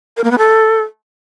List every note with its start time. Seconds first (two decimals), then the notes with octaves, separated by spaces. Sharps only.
0.17 A#4
0.24 A#3
0.31 B3
0.38 A4